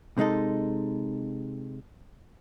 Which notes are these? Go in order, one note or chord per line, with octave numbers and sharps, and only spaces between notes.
C3 G#3 D#4 A4